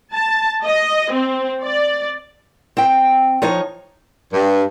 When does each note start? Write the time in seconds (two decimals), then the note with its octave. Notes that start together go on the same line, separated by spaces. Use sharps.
0.13 A5
0.64 D#5
1.12 C4
1.63 D5
2.77 C4 G5
3.42 F3 D#4 C#5
4.33 G2